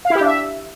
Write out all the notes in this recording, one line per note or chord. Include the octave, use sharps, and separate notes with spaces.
F5
E4
G4
D4
E5